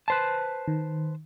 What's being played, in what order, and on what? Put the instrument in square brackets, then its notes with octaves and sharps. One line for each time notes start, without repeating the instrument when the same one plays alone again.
[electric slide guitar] B4 C5 A5
[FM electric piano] D#3